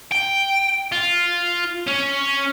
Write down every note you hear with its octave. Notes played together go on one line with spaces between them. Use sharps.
G5
F4
C#4